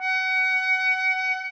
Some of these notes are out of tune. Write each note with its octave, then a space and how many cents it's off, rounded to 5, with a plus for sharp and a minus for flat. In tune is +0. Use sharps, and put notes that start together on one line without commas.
F#5 +25